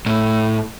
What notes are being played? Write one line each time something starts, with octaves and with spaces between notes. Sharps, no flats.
A2